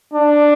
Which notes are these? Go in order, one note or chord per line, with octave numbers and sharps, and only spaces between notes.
D4